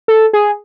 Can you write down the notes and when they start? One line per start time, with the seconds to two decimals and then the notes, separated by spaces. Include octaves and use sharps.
0.08 A4
0.33 G#4